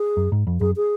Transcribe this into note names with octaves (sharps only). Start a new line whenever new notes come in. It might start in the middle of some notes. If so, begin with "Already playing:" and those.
Already playing: G#4
F#2
G#2
F2
F#2 G#4
G#4